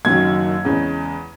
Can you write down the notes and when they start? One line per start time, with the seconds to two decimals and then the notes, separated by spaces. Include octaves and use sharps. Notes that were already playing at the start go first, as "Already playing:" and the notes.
0.05 F#1 F#2 D#3 F#3 G#6
0.65 E2 C#3 G#3 C#4